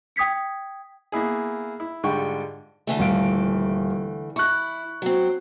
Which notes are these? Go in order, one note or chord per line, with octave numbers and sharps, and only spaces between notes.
G5 D#6 G#6 B6 C#7
A#3 B3 E4 G#4
E4
G#2 D3 G3 F4 G5 C#6
D3 E3 A3
D#1 F5 D7
E4 C#6 F#6
F#3 C4